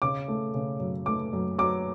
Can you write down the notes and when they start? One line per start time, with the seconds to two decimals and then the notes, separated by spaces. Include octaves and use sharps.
0.02 C#3 D6
0.28 A3
0.54 C#3
0.80 F#2
1.06 A3 D6
1.33 F#2
1.58 F#3 D6